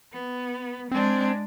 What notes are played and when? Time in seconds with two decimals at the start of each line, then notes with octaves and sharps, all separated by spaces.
0.12 B3
0.91 G#3 C4 D4